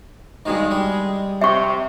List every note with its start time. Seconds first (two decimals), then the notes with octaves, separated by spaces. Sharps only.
0.45 G2 B2 D#3 G#3
0.71 G3
1.41 C3 E5 C#6